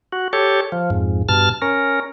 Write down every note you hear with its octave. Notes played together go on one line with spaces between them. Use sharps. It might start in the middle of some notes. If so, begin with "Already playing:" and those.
F#4
G4 A4 C#5
F3
F2 G#2
G2 B2 A5 F6
C#4 A#4